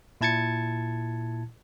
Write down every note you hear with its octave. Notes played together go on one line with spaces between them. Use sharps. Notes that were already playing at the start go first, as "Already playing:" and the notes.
A#2 E4 A5 G#6 A6 C#7